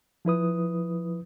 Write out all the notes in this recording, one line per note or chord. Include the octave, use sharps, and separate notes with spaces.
F3 E4 B4 D#6